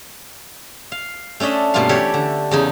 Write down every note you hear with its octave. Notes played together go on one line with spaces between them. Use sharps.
F5
A3 C#4 D4 D#5 E5
G2 B2 A3 A#3 F4 F5
E3 A3 G4 C#5 D5
D3
E2 C#3 D#4